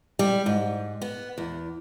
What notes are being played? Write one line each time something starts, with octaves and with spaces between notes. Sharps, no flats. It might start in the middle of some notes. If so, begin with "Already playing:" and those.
G3
G#2
B3
E2